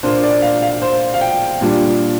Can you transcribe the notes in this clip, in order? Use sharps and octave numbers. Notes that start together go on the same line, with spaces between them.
A#2 A#3 D4 F4 C5
D5
F5
F5
C5
F5
G5
A#2 G3 D4 F4